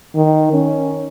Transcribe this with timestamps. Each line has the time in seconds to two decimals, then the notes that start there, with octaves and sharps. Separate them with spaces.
0.16 D#3
0.53 C#4